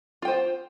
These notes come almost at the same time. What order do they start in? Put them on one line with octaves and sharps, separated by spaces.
F4 G5 C5